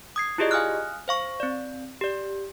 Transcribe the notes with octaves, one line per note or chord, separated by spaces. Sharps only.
D#6 G#6 C7
E4 F4 G4 G#4 D5 D#5
F5 G#5 D#6 F6 F#6
C5 F5 C#6
C4 D5
G4 D5